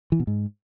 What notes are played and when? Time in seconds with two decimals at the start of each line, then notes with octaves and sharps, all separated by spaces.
0.12 E3
0.20 B2
0.27 G#2